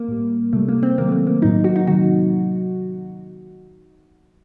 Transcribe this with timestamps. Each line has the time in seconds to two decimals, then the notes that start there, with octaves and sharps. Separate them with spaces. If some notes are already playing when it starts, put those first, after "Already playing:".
Already playing: A#3
0.08 A2 G3
0.53 C3 G3 A3
0.69 A#3
0.83 C4
0.98 C3 D#3 F#3 A#3
1.08 A3
1.12 A#3
1.27 A#3
1.42 A2 F#3 D#4
1.64 F#4
1.76 D#4
1.87 C3 D#3 F#3 F#4